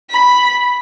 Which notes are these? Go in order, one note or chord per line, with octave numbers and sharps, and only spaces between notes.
B5